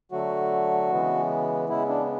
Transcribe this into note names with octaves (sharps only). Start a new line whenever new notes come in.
D3 F#3 A3 F#4
C#3 E3 G#3 B3
C#3 G#3 B3 E4
D4